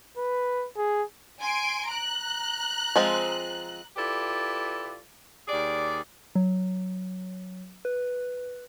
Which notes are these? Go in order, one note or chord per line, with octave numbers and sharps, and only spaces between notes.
B4
G#4
G#5 C6 D7
A#5 F#6
F3 G#3 C4
E4 F4 G4 A4 B4 D5
D#2 G4 G#4 D5
F#3
B4